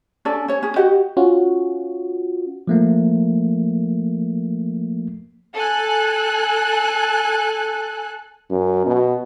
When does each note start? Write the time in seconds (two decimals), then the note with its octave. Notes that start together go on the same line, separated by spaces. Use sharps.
0.25 C#4 D4 A4 D5
0.48 C#4 C#5
0.62 C#4 G#4
0.76 F#4 G4 D#5 F#5
1.17 C#4 F4 F#4
2.67 F3 A3 A#3
5.55 A4 G#5 F#6
8.50 F#2
8.86 B2